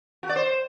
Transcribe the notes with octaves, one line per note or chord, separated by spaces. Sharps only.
F#4
D5
C5